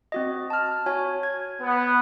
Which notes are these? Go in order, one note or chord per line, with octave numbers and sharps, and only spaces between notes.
C4 F#4 D#5
A5 F6
F#4 C#5 G#5
G#6
B3